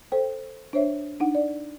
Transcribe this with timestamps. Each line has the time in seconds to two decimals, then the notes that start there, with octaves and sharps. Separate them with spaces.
0.12 A4 C5 G5
0.73 D4 C5 C#5 E5
1.20 D4 D#4 F#5
1.35 D5